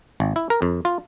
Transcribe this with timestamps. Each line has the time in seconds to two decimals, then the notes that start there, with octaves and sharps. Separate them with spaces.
0.20 G#1
0.36 E4
0.50 A#4
0.62 F2
0.85 F4